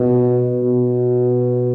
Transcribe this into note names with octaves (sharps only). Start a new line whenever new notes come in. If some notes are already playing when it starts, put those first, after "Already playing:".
Already playing: B2
B2